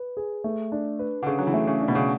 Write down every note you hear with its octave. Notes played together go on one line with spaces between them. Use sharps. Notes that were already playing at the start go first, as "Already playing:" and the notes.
Already playing: B4
G#4
A3
D4
B4
D3
C#3 G#4
F#3
E3
A3
C#3
D4
B2
C#3